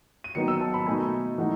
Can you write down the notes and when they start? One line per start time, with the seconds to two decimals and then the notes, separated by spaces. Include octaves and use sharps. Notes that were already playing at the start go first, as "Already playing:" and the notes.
0.24 D#7
0.35 D#3 F#3 B3 D#4 C#7
0.48 E6
0.61 A5
0.74 B5
0.87 B2 A3 D#4 G#5
1.38 E3 A3 D#4 F#5